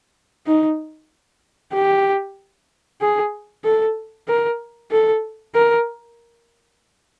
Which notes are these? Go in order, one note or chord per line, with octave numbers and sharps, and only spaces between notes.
D#4
G4
G#4
A4
A#4
A4
A#4